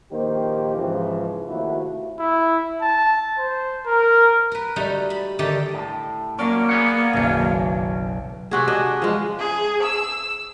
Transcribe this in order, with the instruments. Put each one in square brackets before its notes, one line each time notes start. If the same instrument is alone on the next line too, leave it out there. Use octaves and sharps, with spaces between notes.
[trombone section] A#1 D#3 A#3 G4 C5
G#2 C#3 E3 F3
D#2 C3 A3 E4 F#4
[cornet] E4
A5
C5
A#4
[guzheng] A#4 B4
G3 A3 D#4 F#4
B5
D3 D#3 A3 D#4 G4 D5
[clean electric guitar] A2
[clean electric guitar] F#3 C#4 [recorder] A#3 [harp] D5
[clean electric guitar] B3 G#4 F#5
[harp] F#1 B1 [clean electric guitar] D#3 F#3 C#4
[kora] C3 F#4 G#4
D4 G#4 D#5
F3 G#3
[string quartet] G#4
E6